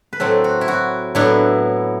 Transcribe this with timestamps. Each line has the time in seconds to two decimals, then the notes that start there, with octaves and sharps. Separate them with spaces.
0.13 B4
0.20 A2 F#3 C4 A4
0.44 F#4
0.61 E4
0.68 F#4
1.15 A2 F#3 B3 D4 E4